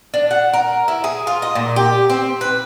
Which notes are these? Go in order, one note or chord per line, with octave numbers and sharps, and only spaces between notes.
D4
F#5
A#4
E4
G#4
F4
D#5
A#2
G4
C4
B4